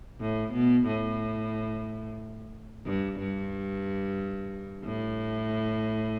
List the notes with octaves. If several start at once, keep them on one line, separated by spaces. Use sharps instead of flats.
A2
B2
A2
G2
G2
A2